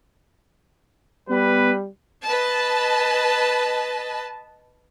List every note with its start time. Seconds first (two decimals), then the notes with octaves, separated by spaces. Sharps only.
1.29 G3 B3 B4
2.24 B4 D#5 A5